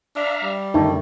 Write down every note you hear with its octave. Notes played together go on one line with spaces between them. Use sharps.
D4 E5 F5 A#5
G3
F#2 D3 D#3 A3 D4 D#4